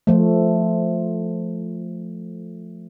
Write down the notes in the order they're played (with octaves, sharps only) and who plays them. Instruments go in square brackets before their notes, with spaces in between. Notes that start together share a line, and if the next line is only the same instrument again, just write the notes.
[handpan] F3 A3